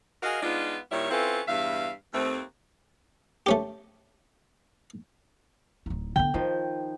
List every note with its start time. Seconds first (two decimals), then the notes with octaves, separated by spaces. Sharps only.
0.23 F#4 G#4 A#4 D#5 F5
0.43 G#3 B3 D4 D#4 F4
0.91 A#2 D#3 G3 E4 C#5
1.11 C4 C#4 E4 F4 A4 B4
1.48 E2 G2 E5 F5
2.14 D#2 A3 C4
3.46 A3 C#4 G4
5.86 D1 D#4
6.16 D3 B3 G5
6.34 D#3 F3 D#4